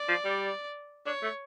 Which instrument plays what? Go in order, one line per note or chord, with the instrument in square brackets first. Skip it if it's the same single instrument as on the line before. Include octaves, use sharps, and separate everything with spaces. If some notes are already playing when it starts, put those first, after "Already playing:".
Already playing: [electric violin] D5
[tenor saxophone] F3
G3
[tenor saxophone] D4 [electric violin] C#5
[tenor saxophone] A3